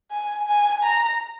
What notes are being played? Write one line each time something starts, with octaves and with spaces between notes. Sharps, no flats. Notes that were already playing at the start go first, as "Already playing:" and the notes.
G#5
G#5
A#5